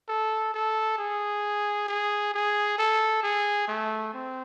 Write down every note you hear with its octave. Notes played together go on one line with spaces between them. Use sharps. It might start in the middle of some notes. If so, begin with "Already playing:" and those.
A4
A4
G#4
G#4
G#4
A4
G#4
A3
C4